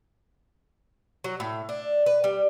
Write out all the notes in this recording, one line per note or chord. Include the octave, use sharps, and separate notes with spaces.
F#3
A2
D4
B4
G3